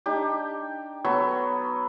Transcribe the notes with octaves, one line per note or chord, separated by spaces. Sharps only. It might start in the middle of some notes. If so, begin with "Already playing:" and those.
D4 D#4 G4
F#3 B3 A4 C#6